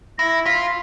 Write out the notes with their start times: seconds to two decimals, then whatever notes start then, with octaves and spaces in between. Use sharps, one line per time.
0.18 E4 A#6
0.46 F4 B6